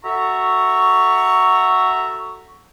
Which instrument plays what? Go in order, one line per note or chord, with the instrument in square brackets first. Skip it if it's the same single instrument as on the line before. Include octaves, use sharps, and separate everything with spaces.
[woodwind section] F#4 A4 E5 A#5 C#6